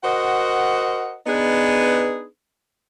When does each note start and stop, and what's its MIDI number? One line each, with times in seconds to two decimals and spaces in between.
0.04 1.14 66
0.04 1.14 70
0.04 1.14 72
0.04 1.14 75
0.04 1.14 78
1.27 2.25 59
1.27 2.25 62
1.27 2.25 63
1.27 2.25 68
1.27 2.25 71